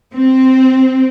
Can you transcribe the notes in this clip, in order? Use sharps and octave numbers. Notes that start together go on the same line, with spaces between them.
C4